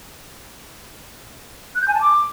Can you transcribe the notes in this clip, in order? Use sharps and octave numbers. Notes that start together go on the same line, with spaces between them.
F#6
G6
G#5
A5
D6